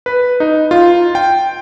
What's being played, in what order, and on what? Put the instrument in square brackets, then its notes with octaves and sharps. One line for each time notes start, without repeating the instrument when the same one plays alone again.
[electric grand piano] B4
D#4
F4
G5